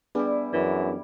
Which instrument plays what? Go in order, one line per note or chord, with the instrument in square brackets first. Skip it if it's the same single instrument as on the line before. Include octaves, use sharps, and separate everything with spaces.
[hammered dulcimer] G3 E4 [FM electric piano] B3 D4 G#4
[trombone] F#2 [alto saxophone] E3